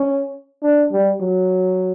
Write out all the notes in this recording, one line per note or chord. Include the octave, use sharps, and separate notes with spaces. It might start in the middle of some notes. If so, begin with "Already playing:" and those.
Already playing: C#4
D4
G3
F#3